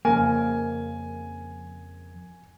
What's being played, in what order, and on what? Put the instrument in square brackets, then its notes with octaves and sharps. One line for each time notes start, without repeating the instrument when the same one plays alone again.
[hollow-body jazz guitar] F2 C#3 A#3 [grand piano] G#5